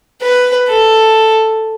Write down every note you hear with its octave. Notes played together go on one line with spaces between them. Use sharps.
B4
A4